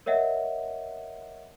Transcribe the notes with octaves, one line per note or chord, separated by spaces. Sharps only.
A#4 C#5 D#5 E5 F#5